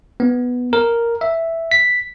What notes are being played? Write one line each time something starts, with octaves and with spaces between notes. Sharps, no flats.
B3
A#4
E5
B6